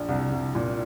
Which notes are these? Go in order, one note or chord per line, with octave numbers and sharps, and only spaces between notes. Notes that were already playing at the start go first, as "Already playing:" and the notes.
Already playing: A#1
C2
C2
A#2